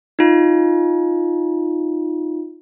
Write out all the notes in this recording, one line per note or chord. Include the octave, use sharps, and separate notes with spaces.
D#4 F4